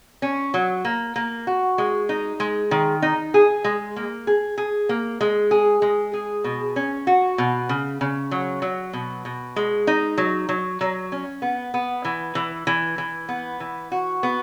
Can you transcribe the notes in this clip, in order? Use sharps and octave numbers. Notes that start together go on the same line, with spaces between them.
C#4
F#3
A#3
A#3
F#4
G#3
D#4
G#3
D#3
D#4
G#4
G#3
A#3
G#4
G#4
A#3
G#3
G#4
G#3
G#4
B2
C#4
F#4
B2
C#3
C#3
F#3
F#3
B2
B2
G#3
D#4
F#3
F#3
F#3
C#4
B3
B3
E3
E3
E3
E3
B3
E3
F#4
B3